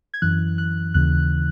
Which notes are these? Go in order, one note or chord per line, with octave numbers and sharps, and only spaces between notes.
G#6
F#2 E3 F#6
F#6
D#2 C#3 E3 F#6